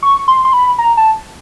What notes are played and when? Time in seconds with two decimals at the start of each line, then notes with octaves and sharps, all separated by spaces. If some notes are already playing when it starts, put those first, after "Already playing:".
0.03 C#6
0.28 C6
0.45 C6
0.53 B5
0.79 A#5
0.97 A5